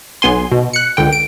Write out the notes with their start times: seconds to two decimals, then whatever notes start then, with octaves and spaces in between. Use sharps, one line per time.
0.22 B1 B3 G#5 C6
0.52 B2
0.73 F#6 C#7
0.97 C#2 D3 G5
1.13 D7